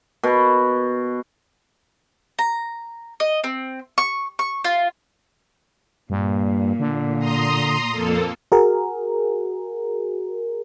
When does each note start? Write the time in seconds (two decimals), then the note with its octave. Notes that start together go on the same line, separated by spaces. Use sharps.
0.23 B2
2.39 A#5
3.20 D#5
3.44 C4
3.98 C#6
4.39 C#6
4.64 F4
6.10 G2 A#2
6.80 D3
7.19 A#5 C6 D#6
7.91 F2 A#3 A4
8.52 F#4 G#4 A#4